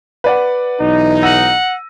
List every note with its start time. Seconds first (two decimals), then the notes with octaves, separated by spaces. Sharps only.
0.24 B4 D5 F#5
0.80 B1 E3 D#4
1.23 F#5 E6 A#6 D#7